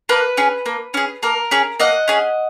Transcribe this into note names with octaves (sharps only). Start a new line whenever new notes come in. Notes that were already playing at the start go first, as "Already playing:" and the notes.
A#3 B4
C#4 G#4
A#3
C#4 G#4
A#3 A#4
C#4 G#4
A#3 D#5 F#5
C#4 G#4